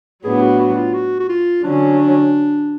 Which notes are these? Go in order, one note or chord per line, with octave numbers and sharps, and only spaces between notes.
A2 F#3 B3 D4 G#4
F#4
F#4
F4
F#4
F#4
F4
D3 F#3 C#4 D4